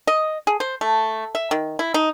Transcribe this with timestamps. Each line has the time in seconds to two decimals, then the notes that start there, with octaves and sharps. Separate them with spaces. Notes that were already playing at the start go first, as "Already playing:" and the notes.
0.07 D#5
0.47 G#4
0.60 C5
0.81 A3
1.35 E5
1.51 D#3
1.79 E4
1.94 D#4